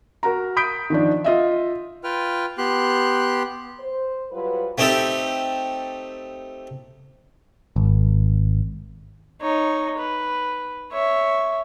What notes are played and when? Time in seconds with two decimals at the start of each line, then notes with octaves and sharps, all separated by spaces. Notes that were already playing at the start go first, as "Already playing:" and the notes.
0.23 F#4 A#4 A#5
0.56 B5 D#6 G6 B6 D7
0.90 D#3 F3 D4
1.24 F4 D#5 E5
2.04 F4 B4 G5 F6
2.58 B3 G4 C6 F#6
3.80 C5
4.31 F#3 G3 F4 B4
4.78 A3 C4 D#4 G4 A4
7.76 G#1
9.41 D#4 C#5
9.98 B4
10.92 C#5 E5